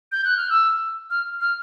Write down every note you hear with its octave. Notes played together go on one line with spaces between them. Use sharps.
G6
F#6
F6
E6
F6
F6